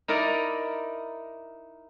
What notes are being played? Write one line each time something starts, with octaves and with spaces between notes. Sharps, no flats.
D#4 E4 A#4 D5 A#5